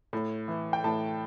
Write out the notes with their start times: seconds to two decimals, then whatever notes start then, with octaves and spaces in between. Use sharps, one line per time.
0.13 A2
0.48 E3
0.73 G5
0.84 A2 A5